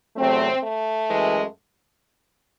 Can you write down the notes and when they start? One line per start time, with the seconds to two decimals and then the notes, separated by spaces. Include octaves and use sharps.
0.16 E2 C3 F#3 A3 C4
0.62 A3
1.10 F#2 E3 G#3